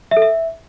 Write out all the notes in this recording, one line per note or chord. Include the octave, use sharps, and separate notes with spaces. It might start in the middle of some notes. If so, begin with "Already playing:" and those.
E5
A4
E5